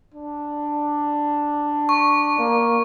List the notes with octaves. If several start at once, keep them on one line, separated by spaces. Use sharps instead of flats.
D4
C#6
A#3